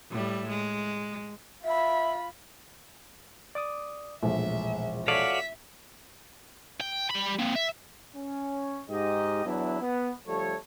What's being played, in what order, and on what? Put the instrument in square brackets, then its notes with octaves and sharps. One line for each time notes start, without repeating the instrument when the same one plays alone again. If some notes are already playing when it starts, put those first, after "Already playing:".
[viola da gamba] A2 G3
G#3
[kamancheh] F4 B5 [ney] E5
[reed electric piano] D5 D6 D#6
[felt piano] E1 A#1 [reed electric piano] A3 [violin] E5
[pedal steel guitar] F#4 D5 F5 [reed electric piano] A4 C#5 [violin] E5 B6
[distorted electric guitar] G5
G3 B5
A#3 C4
E5
[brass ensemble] C#4
G#2 G4 D#5
E2 F#3 B3 D4 E4
B3
D3 F3 G3 A3 A4 C#5